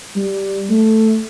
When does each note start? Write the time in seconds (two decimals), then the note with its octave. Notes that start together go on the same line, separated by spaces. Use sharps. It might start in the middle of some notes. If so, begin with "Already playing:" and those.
0.16 G3
0.70 A3